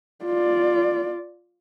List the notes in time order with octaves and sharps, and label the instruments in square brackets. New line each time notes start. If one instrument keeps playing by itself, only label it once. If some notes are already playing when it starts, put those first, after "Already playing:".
[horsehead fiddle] F4 D5